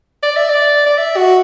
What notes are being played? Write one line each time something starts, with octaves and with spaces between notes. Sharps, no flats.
D5
E5
D5
D5
E5
F#4